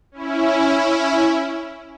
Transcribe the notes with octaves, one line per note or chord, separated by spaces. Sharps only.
C#4 E4